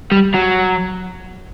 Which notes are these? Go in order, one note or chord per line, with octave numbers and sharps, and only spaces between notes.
G3
F#3